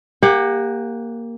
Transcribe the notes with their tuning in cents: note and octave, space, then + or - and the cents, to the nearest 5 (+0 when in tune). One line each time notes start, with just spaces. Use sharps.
A#3 +0 G4 +25 F#5 +0